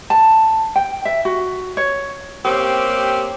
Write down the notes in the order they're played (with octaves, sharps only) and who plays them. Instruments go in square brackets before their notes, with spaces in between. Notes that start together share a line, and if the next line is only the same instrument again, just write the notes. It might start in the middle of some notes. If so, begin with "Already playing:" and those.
[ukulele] A5
G5
E5
F#4
C#5
[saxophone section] A#3 C4 C#4 G4